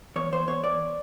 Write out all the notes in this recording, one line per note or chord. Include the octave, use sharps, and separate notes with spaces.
E2 C#5
E2 C5
E2 C#5
E2 D5